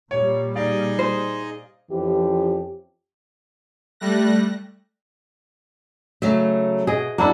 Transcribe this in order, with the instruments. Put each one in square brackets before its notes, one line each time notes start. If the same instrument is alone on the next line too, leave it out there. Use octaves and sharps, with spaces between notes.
[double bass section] A#2 G3 [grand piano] C#5
[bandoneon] D#4 G#4 D#5 [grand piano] D5 F5
[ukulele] C5
[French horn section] F2 E3 F3 C#4 G4
[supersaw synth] G3 A3 F#6 A#6
[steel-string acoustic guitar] C#3 F#3 A3 [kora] E5
[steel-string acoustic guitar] B2 [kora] G#4 D#5
[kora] A#3 D4 E4 [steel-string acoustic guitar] F#4